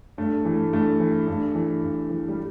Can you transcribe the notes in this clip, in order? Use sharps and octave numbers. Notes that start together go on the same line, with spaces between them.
G2 A3
E3
A3
G2 A3
E3
G2 A3
E3
G2
E3
G3